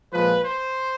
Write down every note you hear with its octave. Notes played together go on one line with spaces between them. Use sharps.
A#2 F3 G#3 B4
C5